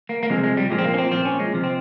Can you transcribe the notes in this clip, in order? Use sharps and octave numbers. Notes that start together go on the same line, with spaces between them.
A#3
A#3
C3 F3 G#3
G#3
G3
A#2 F3 G#3
C4
A#3
C#4
C4
A#2 F3 C4
C#4
G#3
C3 F3
C4